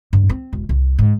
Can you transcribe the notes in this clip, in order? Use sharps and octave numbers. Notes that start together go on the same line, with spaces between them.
G2
C4
E1
C2
G#2